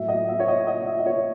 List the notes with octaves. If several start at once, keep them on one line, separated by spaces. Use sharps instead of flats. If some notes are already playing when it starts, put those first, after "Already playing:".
Already playing: A2 F#3 A3 E5
D#5
E5
C#5
D#5
D#5
E5
D#5
C#5